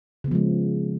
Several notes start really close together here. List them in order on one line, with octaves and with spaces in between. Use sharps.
C#3 B3 F3 G#3